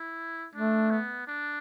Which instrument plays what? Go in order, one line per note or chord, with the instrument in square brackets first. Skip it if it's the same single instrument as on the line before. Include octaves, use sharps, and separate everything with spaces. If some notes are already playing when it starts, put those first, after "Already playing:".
Already playing: [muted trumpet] E4
[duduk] A3 [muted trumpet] D4
[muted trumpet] B3
D4